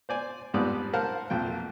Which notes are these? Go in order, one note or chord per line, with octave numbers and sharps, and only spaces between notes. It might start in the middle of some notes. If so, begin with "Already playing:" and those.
C5 D5 G#5
F2 G#2 G3 B3 D5 D#6
A#4 C5 F5 F#5 A5
B1 F2 A#2 G5